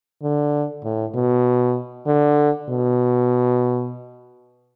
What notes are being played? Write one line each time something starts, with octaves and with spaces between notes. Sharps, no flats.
D3
A2
B2
D3
B2